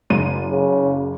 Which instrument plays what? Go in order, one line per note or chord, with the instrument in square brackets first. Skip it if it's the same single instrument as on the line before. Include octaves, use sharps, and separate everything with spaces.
[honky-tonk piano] F#1 D#7
[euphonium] C#3